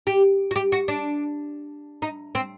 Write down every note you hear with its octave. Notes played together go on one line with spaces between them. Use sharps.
G4
F#4
G4
F#4
D4
D#4
C4